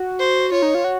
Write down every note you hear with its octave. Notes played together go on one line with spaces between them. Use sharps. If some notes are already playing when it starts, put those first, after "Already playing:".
Already playing: F#4
C5
F4 C#5
D#4
F4
F#4